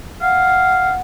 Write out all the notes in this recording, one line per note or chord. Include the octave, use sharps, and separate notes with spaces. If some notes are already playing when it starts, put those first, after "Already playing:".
F5 F#5